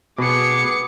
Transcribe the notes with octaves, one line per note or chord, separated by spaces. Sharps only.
B2 B3 G#4 D6 C#7